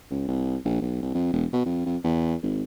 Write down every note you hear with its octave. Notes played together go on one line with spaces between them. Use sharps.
C#2
C2
A#1
B1
C2
F2
E1
B2
F2
F2
E2
G#1